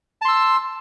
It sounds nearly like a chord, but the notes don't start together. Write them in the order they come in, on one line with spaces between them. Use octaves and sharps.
A5 C6 E6